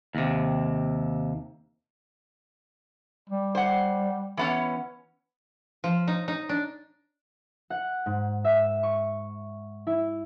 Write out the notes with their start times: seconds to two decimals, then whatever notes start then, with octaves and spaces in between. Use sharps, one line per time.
0.15 D#2 C3
3.29 G3
3.55 C5 F#5
4.37 E3 B3 C#4
5.84 F3
6.08 D#4
6.28 D#4
6.49 D4
7.70 F#5
8.06 G#2
8.44 E5
8.83 C#6
9.87 E4